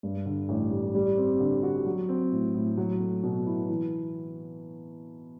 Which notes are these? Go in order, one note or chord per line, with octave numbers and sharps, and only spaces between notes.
G2
D3
A1
G3
G3
C4
D3
F#4
F#3
C4
A2
A2
F#3
A3
B2
E4
E3